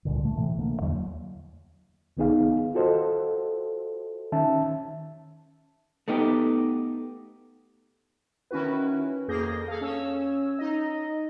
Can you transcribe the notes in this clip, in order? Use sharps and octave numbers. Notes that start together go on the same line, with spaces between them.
C#2 G2 A#2 D3
A3
A2 C3 E3
D2 D3 A#3
E2 F#3
C2 D#3 B3 D#4 G#4 F5
F4 F#4 A4 C5 D#5
D#3 C#4 E5 A5
A3 B3 D#4 G4
D#3 C#4 E4 F#4 B4
F2 A#3 G#4 G6 A#6
G#4 A4 F5
C#4 C#5 E6
D#4 D#5